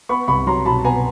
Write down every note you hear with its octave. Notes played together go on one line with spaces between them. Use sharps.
B3 B5 C#6
C2 B5 C#6
F#3 A#5 C6
B2 A5 B5
B3 G#5 A#5